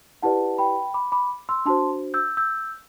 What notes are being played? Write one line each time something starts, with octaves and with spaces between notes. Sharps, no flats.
E4 G4 B4 D5 F#5 A5
G5 B5
B5 D6
B5 D6
C6 E6
D4 F#4 C5 A5 C6
E6 G6
E6 G6